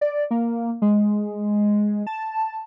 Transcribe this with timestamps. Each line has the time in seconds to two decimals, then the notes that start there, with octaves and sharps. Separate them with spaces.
0.01 D5
0.31 A#3
0.82 G#3
2.07 A5